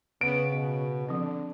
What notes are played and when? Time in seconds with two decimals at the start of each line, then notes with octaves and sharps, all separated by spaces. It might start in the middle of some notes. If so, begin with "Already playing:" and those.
0.21 C#3 B3 D7
0.53 B2
1.09 D3 F3 C4